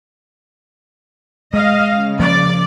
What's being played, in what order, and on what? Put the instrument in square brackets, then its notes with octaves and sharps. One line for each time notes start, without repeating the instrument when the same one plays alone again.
[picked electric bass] G#3 [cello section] D#5 [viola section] F5
[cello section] C#3
[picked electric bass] F3 A#3 [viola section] D5